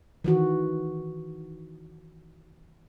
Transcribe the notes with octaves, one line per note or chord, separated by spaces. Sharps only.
D#3 E3 F#4